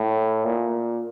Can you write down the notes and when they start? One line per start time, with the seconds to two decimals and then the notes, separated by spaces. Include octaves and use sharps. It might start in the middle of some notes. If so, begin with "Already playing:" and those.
Already playing: A2
0.45 A#2